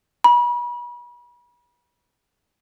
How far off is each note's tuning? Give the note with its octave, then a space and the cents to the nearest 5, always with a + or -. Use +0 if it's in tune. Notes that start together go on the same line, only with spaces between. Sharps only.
B5 -35